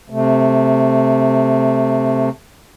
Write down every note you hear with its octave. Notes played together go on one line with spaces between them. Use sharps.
C3 A3